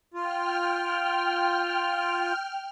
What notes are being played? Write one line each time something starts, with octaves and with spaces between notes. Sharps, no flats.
F4 G5 F6